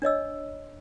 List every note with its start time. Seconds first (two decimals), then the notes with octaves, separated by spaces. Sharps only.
0.02 D4 C#5 D#5 E6